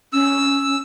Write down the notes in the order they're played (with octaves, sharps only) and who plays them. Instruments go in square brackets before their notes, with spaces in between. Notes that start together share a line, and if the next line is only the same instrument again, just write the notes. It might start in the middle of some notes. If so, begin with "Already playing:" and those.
[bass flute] C#4 [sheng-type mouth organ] E6